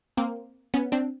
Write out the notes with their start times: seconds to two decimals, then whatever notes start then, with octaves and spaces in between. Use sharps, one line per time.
0.17 A#3 C4
0.74 B3 C#4
0.92 C4 D4